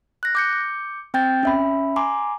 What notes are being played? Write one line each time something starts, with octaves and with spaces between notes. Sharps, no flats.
F#6 A#6
D6 G6 C#7
C4 G5 G6 A6
C#4 E5 B5
G#5 A#5 C6 D6